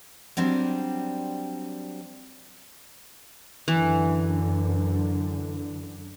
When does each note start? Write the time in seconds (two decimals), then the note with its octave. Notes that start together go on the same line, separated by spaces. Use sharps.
0.37 F#3 G3 C4 D4
3.68 F#2 D3 E3